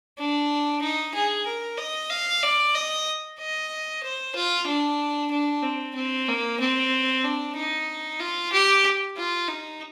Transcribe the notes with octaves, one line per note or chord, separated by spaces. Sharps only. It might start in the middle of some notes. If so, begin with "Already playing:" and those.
D4
D#4
G#4
A#4
D#5
F5
D5
D#5
D#5
C5
F4
D4
D4
C4
C4
A#3
C4
D4
D#4
F4
G4
F4
D#4